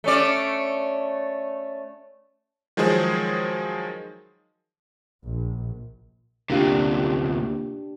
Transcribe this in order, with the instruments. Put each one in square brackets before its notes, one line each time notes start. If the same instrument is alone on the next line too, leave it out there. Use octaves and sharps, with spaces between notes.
[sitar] A3 C#4 D5
[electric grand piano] D#3 F3 F#3 G#3 G#4 C5
[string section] A#1
[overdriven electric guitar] D2 C3 [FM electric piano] A#3 F4 [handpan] D4 G4